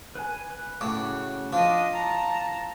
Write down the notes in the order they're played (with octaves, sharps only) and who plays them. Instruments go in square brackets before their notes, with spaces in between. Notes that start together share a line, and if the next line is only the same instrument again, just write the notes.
[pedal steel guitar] B4 G#5
B4
[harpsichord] A2 [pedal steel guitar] C#3 F#4 D6
[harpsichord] F3 [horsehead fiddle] D4 D#5 [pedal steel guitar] D6
[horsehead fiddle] A5 A#5